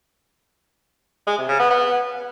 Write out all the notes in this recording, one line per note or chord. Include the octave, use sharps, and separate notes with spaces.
G#3
C3
C#3
B3
B3